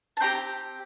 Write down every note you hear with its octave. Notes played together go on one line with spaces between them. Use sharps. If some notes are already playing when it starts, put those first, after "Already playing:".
A5
C4 G4 G5 A#5